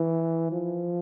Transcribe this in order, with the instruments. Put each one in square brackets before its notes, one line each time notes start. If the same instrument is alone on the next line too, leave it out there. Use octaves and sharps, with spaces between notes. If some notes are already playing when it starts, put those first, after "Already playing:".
Already playing: [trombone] E3
F3